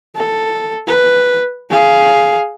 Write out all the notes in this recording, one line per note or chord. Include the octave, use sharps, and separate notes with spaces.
A4
B4
G#4 F5